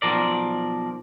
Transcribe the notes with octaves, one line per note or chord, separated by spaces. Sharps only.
B1 G2 F3 A#4 D5